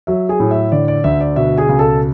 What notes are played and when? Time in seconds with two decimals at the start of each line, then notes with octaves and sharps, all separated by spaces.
0.07 F#3 E5
0.29 G#4 G#5
0.40 A2
0.51 E5
0.72 D3 D5
0.88 D5
1.04 D2 E5
1.21 D5
1.36 B2 E5
1.58 G#4 G#5
1.69 C#2
1.79 A4 A5